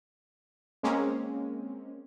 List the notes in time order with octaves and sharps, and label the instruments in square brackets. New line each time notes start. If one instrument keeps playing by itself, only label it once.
[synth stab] G#3 A#3 C4 C#4